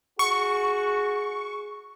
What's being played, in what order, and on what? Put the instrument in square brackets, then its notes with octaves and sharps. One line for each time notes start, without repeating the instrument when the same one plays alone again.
[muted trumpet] F#4 [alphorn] G#4 [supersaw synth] C#6